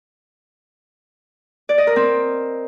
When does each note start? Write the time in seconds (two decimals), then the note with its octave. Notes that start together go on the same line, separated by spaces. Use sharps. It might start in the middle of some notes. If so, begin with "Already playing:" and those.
1.69 D5
1.78 D#5
1.87 A#4
1.96 C4